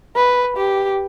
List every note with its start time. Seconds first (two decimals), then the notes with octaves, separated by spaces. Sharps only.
0.16 B4
0.57 G4